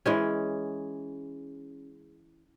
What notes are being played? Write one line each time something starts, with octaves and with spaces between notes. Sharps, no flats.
E3 G#3 C#4